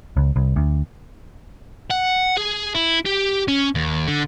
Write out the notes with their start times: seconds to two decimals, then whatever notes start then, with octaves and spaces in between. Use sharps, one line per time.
0.17 C#2
0.36 C2
0.56 D2
1.91 F#5
2.37 G#4
2.74 E4
3.05 G4
3.48 C#4
3.75 D#2
4.08 D3